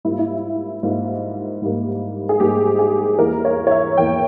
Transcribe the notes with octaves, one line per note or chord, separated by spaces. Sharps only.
G#2 G3 A#3 E4
F4
E4
G#2 G3 A#3 F4
G#2 G3 A#3
G#4
G#2 G3 A#3 G4
G#4
E2 E3 A#3 A#4
C#5
C#5
E5
E2 E3 A#3 G5